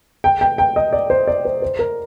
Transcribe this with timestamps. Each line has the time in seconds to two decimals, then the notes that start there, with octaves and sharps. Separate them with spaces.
0.24 G5
0.41 G5
0.58 G5
0.76 D#5
0.93 D5
1.10 C5
1.27 D5
1.45 C5
1.62 C5
1.79 A#4